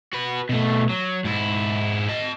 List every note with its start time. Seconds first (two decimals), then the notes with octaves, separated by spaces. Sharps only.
0.13 F#4 B4
0.49 B2 A3
0.89 F#3
1.25 G#2 E4
2.09 D#5 A5